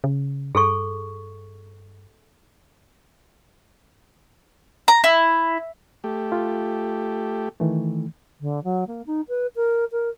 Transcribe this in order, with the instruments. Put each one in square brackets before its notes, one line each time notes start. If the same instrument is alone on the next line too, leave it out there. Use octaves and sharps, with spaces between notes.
[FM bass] C#3
[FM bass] G2 [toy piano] G#4 A4 C#6
[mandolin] A#5
E4
[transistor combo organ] A3 G4
[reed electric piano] F4
D#3 E3 A3
[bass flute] D3
F#3
A#3
D#4
B4
A#4
A#4